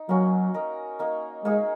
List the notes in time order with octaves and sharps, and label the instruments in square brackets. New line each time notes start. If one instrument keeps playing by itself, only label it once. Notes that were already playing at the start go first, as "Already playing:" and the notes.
Already playing: [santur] D#4
[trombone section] F#3 [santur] A#3 C#4 F#4
[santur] D#4 A#4 D#5
A#3 D#4 A#4
[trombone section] G#3 [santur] A#3 D#4 G#4